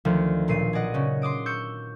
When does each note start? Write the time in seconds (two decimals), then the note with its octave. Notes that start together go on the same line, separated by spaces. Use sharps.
0.05 D2 D#3 F3
0.48 B1 A#2 C7 D#7
0.73 G#4 D5 D#5 F#5
0.94 C#3 C#4 F#4
1.22 C6 D6 D#6 D7
1.46 C#6 E6 G6 C#7